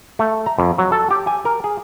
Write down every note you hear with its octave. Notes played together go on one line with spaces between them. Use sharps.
A3
A#5
F2
F#3
A4
G4
G#5
A#4
G#4